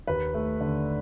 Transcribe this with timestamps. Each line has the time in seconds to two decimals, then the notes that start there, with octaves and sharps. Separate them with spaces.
0.07 D#2 B4
0.34 A3
0.61 D3